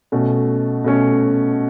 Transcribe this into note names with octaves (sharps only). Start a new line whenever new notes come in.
B2 A3 C#4
B2 A3 C#4